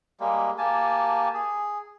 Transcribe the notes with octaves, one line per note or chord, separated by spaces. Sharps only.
G3 G#3 A#3
A#3 G4 G#5 A5
G#4